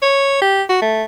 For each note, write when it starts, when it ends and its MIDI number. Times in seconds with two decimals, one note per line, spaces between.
0.02 0.41 73
0.41 0.63 67
0.69 0.81 66
0.82 1.04 57